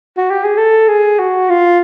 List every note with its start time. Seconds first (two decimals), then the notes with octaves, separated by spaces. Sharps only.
0.18 F#4
0.31 G4
0.44 G#4
0.58 A4
0.88 G#4
1.19 F#4
1.50 F4